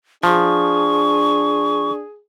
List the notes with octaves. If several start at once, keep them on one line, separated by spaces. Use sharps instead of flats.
F3 D4 G#4 C#6